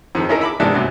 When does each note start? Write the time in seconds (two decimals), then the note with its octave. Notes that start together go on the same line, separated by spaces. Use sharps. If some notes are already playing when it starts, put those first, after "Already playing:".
0.15 F2 D#3 F3
0.29 C#4 D#4 E4 G#4 A#4
0.41 E5 B5 D6
0.60 G#2 C3 D#3 E3 D4 E4
0.74 C2 F#2 C3